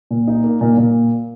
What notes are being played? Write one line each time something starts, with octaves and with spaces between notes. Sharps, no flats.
A#2
D#4
A#3
A#2
A#2